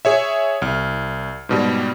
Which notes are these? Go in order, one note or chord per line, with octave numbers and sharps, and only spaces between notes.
G#4 C#5 E5
C2 F6
G#2 B2 G3